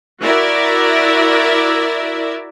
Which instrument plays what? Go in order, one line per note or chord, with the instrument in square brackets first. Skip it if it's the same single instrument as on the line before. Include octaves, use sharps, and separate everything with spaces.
[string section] E4 F#4 A#4 D5 E5